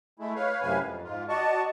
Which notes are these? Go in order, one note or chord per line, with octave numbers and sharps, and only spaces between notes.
G#3 A3 E4
B4 C#5 F5
F#2 A2 C3 B4 F5 G#5
F2
G#2 F4
F#4 D5 D#5 A5 C#6